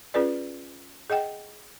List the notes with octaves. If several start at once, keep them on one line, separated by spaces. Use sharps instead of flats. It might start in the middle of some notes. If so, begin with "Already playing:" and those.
C#4 F4 G#4 B4 D5
G#4 D#5 F#5 G5